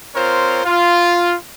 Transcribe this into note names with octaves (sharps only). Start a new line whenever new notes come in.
C4 F4 A#4 C5 C#5
F4